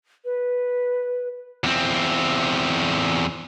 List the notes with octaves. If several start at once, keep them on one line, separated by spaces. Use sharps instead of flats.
B4
E2 C4